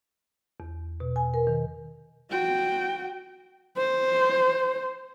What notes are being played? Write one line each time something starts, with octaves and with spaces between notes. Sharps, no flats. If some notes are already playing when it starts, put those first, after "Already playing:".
E2
B2
G#5
A#4
D#3
F#4 G5
C5